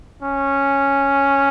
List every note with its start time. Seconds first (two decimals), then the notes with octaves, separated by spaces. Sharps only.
0.22 C#4